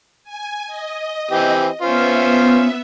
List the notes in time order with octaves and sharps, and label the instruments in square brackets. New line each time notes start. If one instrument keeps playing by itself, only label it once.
[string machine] G#5
D#5
[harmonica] E3 C4 G4
[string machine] B3 E5 [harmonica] C#4 F4 C5